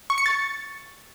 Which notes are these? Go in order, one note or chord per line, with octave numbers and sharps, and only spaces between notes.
C#6
C#7
A6